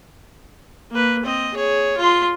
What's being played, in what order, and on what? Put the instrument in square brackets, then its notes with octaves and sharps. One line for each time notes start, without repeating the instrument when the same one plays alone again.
[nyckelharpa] A#3 B4
C4 D#5
G#4 C#5
F4 C6